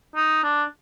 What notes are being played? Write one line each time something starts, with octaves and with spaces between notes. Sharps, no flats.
D#4
D4